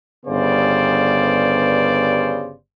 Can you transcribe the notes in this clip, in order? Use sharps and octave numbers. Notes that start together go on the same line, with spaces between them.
G1 C#3 G3 B3 C5 D5